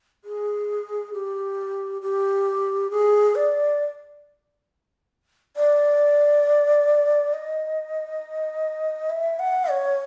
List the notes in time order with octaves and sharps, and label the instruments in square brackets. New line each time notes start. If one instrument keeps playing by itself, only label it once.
[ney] G#4
G4
G4
G#4
D5
D5
D#5
E5
F#5
C#5